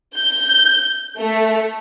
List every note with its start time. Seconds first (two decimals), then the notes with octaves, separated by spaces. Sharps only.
0.15 G6
1.18 A3